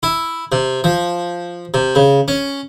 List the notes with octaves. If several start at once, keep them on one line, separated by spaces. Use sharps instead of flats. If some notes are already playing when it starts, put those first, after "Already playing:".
E4
C3
F3
C3
C#3
C#4